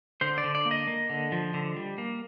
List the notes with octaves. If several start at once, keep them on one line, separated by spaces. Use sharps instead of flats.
D3 C5
D5
D3
D5
A#3
D#5
A#3
D3
F3
D3
G3
A#3